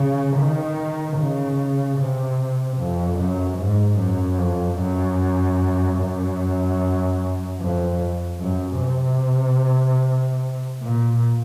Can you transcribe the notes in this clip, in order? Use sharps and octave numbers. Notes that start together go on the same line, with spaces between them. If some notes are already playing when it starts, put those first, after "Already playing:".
Already playing: C#3
D#3
C#3
C3
F2
F#2
G#2
F#2
F2
F#2
F#2
F2
F#2
C3
A#2